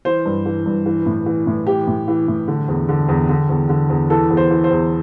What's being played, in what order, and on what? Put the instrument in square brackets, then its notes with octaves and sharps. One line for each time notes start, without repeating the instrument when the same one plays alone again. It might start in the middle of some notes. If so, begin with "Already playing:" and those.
[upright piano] E3 C5
G2
E3
G2
E3
A2
E3
A2
E3 G4
A2
E3
A2
D3
E2
D3
E2
D3
E2
D3
E2
E3 A4
E2
C5
E3
C5
E2